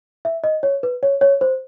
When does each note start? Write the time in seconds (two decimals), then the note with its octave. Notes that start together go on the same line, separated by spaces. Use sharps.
0.25 E5
0.44 D#5
0.63 C#5
0.83 B4
1.03 C#5
1.21 C#5
1.41 C5